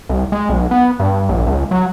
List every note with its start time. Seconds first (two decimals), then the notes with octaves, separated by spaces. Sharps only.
0.09 C2
0.32 G#3
0.49 B1
0.71 B3
1.00 G2
1.29 A#1
1.47 C#2
1.71 F#3